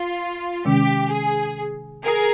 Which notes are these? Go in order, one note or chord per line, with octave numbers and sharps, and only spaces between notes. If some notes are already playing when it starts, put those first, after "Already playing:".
Already playing: F4
C3 D#3 G#3 C#4 G4
G#4
G#4 A#4